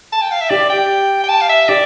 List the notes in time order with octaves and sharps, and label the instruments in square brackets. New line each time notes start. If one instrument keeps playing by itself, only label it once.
[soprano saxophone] A5
G5
F5
E5
[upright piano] G4 [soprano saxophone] D5
[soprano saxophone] G5
G5
A5
F5
E5
[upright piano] G4 [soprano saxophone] D5